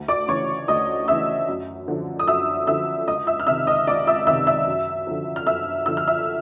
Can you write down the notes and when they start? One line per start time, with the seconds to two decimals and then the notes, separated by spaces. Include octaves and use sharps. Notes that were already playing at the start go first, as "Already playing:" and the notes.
Already playing: D2
0.08 D5 D6
0.28 C#3 E3 C#5 C#6
0.68 D2 D#5 D#6
1.08 C#3 E3 E5 E6
1.48 F#2
1.88 D3 F3
2.19 D#6
2.27 F#2 E5 E6
2.67 D3 F3 E5 E6
3.07 C#2 D#5 D#6
3.27 E5 E6
3.40 F6
3.47 C3 D#3 E5 E6
3.67 D#5 D#6
3.87 C#2 D5 D6
4.07 E5 E6
4.27 C3 D#3 E5 E6
4.47 E5 E6
4.67 F#2
5.07 D3 F3
5.36 F6
5.47 F#2 E5 E6
5.86 D3 F3 E6
5.97 F6
6.07 E5 E6